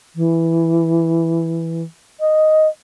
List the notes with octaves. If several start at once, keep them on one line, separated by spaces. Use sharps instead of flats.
E3
D#5